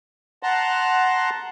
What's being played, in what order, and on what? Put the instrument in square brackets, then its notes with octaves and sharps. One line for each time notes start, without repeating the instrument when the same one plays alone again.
[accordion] F#5 A5 A#5 C6